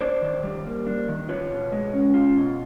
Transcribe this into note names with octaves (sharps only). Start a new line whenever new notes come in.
D4 C5 D5
D#3
G3
A#3
D4
D#3
F4 B4 C#5
B2
G#3
C#4
F4
B2